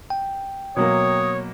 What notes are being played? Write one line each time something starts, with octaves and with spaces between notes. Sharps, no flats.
G5
B2 F#3 A#3 C#5 D#6